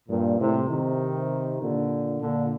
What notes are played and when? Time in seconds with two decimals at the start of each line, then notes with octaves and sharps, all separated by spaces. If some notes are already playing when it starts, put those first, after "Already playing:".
0.09 G2 A#2
0.39 A2 C3
0.69 C3 D#3
1.60 A#2 D3
2.21 A#2 D3